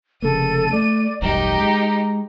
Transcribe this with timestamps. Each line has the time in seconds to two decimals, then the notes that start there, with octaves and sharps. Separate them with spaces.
0.22 F1 C#3 A#3 A4 D#7
0.72 A3 D5
1.22 D#1 G#1 F#2 D#4 G4 A#5
1.58 G#3